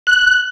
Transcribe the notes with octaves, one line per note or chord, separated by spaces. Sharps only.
F#6